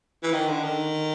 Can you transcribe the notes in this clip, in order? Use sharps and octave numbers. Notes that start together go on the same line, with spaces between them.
E3
D#3
D3
D#3